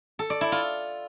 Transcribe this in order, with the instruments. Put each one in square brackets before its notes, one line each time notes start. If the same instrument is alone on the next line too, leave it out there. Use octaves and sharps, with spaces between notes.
[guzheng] A4
D5
E4
F4